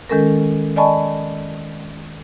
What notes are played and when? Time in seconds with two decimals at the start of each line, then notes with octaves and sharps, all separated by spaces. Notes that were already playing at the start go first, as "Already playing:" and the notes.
0.09 D#3 G#3 C#4 A4 A#4
0.76 D5 D#5 G#5 A5 B5 C#6